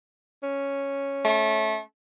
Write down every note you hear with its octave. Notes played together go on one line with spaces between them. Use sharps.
C#4
A3